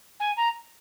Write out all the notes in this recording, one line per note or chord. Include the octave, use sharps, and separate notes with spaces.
G#5
A#5